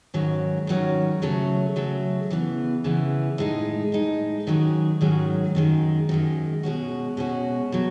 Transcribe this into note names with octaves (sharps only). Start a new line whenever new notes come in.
G#2 D#3 F#3 C#4
G#2 D#3 F#3 C#4
C#3 F#3 A3 C#4
C#3 F#3 A3 C#4
C#3 E3 B3
C#3 E3 B3
A2 G#3 D#4
A2 G#3 D#4
G#2 D#3 F#3 C#4 G#4
G#2 D#3 F#3 C#4 G#4
F#2 D#3 G#3
F#2 D#3 G#3
B2 G#3 C#4 F#4
B2 G#3 C#4 F#4
B2 F#3